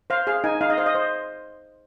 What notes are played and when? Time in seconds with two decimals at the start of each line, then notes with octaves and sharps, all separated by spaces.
0.10 C5 F5
0.27 G#4 F5
0.44 D#4 G#5
0.61 D#4 F5
0.70 D#5
0.77 C5 F5
0.86 D#5
0.95 C5